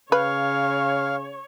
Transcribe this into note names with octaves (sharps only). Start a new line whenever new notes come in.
C#3 B4 C#5 F5